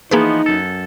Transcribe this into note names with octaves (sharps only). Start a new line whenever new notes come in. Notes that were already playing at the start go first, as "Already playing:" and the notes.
E3 F3 A#3 B3 D#4 G#4 B4
F#2 A4